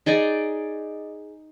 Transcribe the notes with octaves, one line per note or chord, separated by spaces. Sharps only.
D#4 G#4 D5 D#5